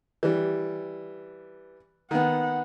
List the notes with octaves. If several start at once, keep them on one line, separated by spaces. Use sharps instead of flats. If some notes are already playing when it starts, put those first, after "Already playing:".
E3 G3
D#3 B3 F#5